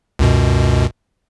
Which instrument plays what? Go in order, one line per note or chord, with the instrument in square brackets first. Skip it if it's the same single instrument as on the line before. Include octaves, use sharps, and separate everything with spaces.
[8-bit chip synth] C#2 F#2 B2